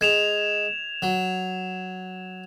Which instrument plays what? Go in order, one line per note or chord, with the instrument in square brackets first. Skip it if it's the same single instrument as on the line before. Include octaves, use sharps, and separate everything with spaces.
[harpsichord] G#3 [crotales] G#6 E7 F7
[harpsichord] F#3